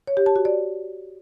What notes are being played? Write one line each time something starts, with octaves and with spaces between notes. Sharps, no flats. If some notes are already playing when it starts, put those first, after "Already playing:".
C#5
G4
A5
F#4
D5